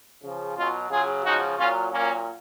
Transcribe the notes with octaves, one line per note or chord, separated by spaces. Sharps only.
C#3 F3
B2 F#3 C#4 F4
C#3 F#3 F4 G#4
C#3 F3 D#4 F#4
A#2 F#3 C#4 F4
A#2 F#3 A#3 C#4